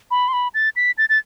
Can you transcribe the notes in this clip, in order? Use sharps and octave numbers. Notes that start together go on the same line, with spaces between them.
B5
C6
B5
A6
B6
A6
A6